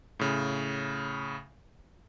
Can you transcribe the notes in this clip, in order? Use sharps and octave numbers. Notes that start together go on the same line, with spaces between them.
A2 C#3